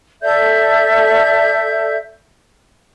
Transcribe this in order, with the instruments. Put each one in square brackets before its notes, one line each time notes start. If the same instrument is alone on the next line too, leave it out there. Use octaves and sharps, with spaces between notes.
[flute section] A4 D5 E5 G6